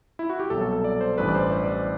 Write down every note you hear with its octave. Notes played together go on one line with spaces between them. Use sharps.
E4
F#4
G4
C2 B2 F#3 A4
A4
A4
D5
C5
A1 G2 E3 B4
D5
C5
C5
D5